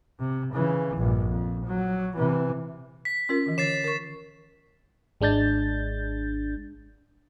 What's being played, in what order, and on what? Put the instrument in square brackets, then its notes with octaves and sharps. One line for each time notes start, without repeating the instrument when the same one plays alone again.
[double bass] C3
C#3 E3
A#1 G2
F2
F#3
C3 E3
[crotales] B6
[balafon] C#4 F4 A#4
D#3 E3
[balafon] D3 [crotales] A6 C7 E7
[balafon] A#4 C#6
[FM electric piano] G#1 G#3 D4 G6 A6